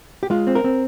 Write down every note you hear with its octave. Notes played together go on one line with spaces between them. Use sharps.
G4
G#3 F4
C4
A#4
C4